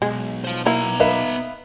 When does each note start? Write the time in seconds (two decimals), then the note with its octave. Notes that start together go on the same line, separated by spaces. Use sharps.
0.02 B1 G#3
0.44 C5 F5
0.66 A#3 B3 E4 A#5
1.00 D#4 B4 E5 F5